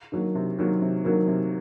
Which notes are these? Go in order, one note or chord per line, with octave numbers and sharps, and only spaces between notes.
D#3 F#3 A#3
C3
D#3 F#3 A#3
C3
D#3 F#3 A#3
C3